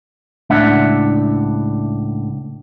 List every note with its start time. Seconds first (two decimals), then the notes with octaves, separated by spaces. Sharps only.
0.50 C#2 A2 D4 E5 F#5